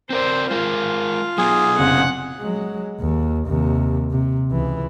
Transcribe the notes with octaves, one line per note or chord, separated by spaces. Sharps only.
C4 A#4 C5 D5
G#3 F4 A#4
F#3 B3 G#4
F#1 C3 F#5
F#3 G#3
D#2
D#2 C3
C3
C#2 E3